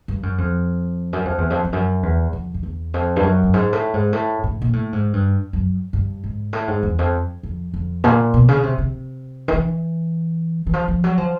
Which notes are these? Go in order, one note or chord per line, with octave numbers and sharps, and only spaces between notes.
G2
F#2
F2
F#2
F2
E2
F2
F2
F#2
E2
F2
F2
E2
F2
G2
F#2
G2
G#2
A2
G#2
A2
A2
A#2
A2
G#2
G2
F#2
G2
G#2
A2
G#2
E2
F2
F2
F2
A#2
B2
C#3
C3
C3
D#3
E3
E3
F3
F3
F#3
F3